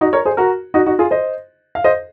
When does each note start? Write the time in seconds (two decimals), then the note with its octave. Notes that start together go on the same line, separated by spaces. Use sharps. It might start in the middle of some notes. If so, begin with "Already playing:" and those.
0.01 D#4 F#4
0.13 A#4 C#5
0.25 G#4 C5
0.37 F#4 A#4
0.74 D#4 F#4
0.86 D#4 F#4
0.99 F4 G#4
1.11 C5 D#5
1.75 F5
1.84 C5 D#5